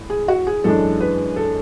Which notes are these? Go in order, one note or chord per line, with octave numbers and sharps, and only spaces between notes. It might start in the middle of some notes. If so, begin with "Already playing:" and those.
Already playing: A2
G#4
F#4
G#4
F#2 E3 G#3 D4 A4
B4
A4